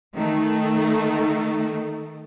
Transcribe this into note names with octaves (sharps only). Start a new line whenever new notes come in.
D#3 A3